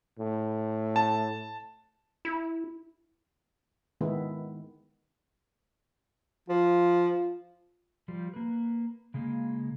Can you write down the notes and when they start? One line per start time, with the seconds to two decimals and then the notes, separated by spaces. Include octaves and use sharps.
0.19 A2
0.96 A5
2.25 E4
4.01 D#3 G#3 B3 E4
6.49 F3 F4
8.08 F3 G3
8.34 A#3 B4
9.14 C#3 G#3 A#3